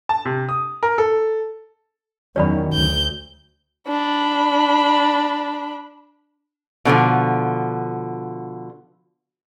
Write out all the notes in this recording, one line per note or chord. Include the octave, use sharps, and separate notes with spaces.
A5
C3
D#6
A#4
A4
E2 D#3 F#3 C#4 C#5 D5 B5
D2 G6
D4 B5
B2 D3 E3 F3